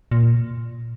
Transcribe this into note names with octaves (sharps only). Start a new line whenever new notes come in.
A#2